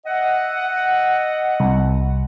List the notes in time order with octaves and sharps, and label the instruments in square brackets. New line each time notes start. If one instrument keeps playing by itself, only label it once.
[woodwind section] D#5 E5 F#5
[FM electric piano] C2